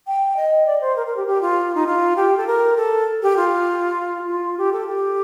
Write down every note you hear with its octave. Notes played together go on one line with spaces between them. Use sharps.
G5
D#5
D5
C5
A#4
A#4
G4
G4
F4
D#4
F4
G4
A4
A#4
A4
G4
F4
F4
G4
A4
G4